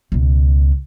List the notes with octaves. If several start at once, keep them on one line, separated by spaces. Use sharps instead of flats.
C#2 B2